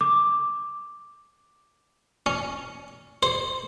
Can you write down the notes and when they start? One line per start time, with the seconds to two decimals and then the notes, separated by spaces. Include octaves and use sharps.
0.01 D6
2.26 C#4
3.23 C5